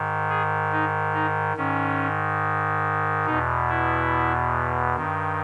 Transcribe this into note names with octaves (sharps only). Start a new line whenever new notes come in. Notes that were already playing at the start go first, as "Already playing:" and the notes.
Already playing: G#2 D#3
G#4
D#4
D#4
G#2 D#3 C#4
E2 B2 D#4
E4
G2 D#3